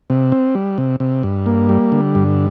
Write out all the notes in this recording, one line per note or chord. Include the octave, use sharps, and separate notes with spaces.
C3
C4
G3
C3
C3
G2
A#3
G3
D3
G2